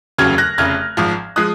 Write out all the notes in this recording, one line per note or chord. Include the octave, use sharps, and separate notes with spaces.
F1 D#2 C#3 F#3 F6 G#6
F#6 A#6
F1 F2 C#3 F6 G#6
G#1 G#2 F3
F3 G#3 D#6 F#6